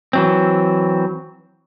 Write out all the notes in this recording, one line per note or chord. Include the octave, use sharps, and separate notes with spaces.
E3 F#3 C4